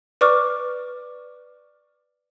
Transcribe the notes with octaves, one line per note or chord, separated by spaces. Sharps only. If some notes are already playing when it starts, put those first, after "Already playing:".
B4 D5 C#6 D6 F6